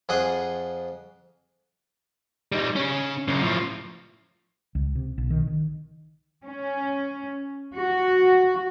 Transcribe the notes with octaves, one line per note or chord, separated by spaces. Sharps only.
F2 G#4 F#5 C6 D#6
G3 D#4
C#3 C#4
F#2 C#3
A2 F3
C#2
C3
B1
D#3
D#3
C#4
F#4